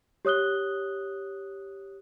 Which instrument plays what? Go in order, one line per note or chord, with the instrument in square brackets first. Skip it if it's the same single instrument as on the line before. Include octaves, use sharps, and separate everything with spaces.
[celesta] G4 C#5 D#6 F#6 G7